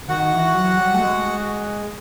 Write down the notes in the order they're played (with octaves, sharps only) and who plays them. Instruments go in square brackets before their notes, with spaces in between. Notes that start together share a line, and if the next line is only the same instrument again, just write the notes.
[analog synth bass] D#3 [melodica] F#4 F#5
[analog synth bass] E3
F#3
G3
A3
G#3